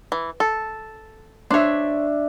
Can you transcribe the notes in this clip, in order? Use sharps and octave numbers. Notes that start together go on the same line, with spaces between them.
E3
A4
D4 C5 C#5 E5